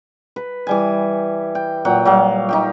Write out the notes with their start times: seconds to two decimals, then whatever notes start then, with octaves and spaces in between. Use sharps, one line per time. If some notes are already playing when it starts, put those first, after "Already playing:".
0.36 B4
0.67 E3 G3 G#5
1.55 G5
1.85 A#2 F#3 F#5 G5
2.05 F#3 G3 F5
2.49 D#4 G4 G5